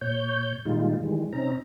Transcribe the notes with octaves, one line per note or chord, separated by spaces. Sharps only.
A#2 C#5 G6
A#2 D#3 G3 G#3 D#4 F4
D#3 E3 G3 G#3
C3 C4 C#4 D#4 A#5